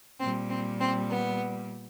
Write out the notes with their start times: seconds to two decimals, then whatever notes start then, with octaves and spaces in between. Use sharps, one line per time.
0.20 A#2 G3 C4
0.50 C4
0.80 C4
1.11 B3